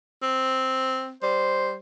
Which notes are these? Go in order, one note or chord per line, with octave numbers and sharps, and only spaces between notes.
C4
G3 C5